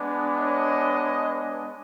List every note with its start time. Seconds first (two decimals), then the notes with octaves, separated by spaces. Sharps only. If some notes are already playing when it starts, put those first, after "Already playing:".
Already playing: G#3 B3 D4
0.40 C#5 D#5